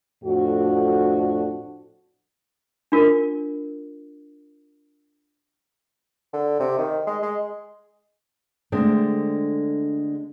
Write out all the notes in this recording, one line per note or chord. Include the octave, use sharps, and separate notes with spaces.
F2 A2 D4 F#4
D4 F4 A#4
D3
C3
D#3
G#3
G#3
D3 G#3 A3 C4 D4